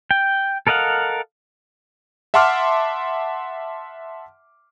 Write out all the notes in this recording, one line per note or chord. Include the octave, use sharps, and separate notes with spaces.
G5
A4 A#4 D#5 F5 F#5
E5 F#5 A5 C6 D6 F6